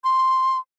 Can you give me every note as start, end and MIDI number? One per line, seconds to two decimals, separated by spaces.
0.04 0.59 84